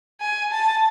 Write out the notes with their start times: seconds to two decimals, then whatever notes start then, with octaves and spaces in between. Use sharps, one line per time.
0.21 G#5
0.51 A5